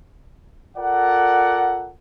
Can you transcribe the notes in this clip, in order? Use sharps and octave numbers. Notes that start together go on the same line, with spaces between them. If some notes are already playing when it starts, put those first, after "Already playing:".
F4 A4 A#4 D5 F#5